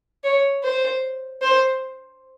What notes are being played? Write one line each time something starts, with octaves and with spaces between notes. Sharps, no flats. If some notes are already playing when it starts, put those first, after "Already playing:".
C#5
C5
C5